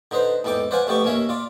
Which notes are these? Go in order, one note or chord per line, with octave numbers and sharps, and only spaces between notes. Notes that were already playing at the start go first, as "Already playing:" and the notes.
D3 D#4 B4 C5
E2 G#2 A4 G5 D6
B4 C5 D5 F5 F#5 G#5
F2 A3 B3 G4 D5 C#6
D#2 A#3 C#4 C#5 E5
F4 D5